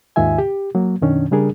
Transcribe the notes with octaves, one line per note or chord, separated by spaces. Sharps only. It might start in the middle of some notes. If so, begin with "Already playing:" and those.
D#2 G#2 D#3 F4 E5 G#5
G4
F#3 A#3
F#2 B2 D#3 C#4 D4
C#3 G3 D4 G#4 A#4